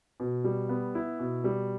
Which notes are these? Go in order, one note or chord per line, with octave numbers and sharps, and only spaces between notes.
B2
G3
B3
E4
B2
G3